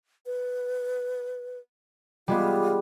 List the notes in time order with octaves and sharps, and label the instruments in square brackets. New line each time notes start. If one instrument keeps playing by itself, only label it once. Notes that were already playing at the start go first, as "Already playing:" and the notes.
[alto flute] B4
[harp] G3 G#3 B3 [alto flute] F4